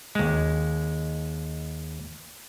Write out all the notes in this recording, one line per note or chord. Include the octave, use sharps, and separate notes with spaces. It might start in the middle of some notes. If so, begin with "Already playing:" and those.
D#2 G#3